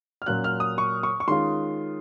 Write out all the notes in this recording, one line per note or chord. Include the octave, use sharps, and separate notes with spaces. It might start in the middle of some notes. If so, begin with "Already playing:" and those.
F6
A#2 F#3 C#4 F4 F#6
F6
D#6
C#6
C#6
C#6
D#3 G#3 C#4 F4 C6